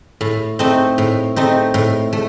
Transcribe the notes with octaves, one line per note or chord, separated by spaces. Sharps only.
A2
A3 C4 D#4
A2
A3 C4 D#4
A2
A3